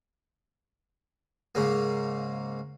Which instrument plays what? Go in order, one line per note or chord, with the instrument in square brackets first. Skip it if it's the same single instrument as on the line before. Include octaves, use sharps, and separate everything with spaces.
[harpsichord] G#2 C#3 A#3